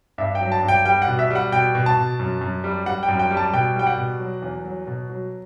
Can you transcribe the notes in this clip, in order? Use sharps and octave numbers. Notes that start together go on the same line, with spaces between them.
G2 E5
G5
F#3
A5
G2
G5
G3 G5
F#5
B2
E5
G3 F#5
B2 G5
B2
A5
B2
F#2
F#2
G3
G3 F#5
G5
F#2
G5
G3
A5
B2 G5
G3 G5
F#5
B2
F#3
E2
F#3
B2
F#3